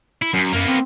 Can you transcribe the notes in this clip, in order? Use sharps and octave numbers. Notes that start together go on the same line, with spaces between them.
E4
F#2
F#2 A#3 B3
C4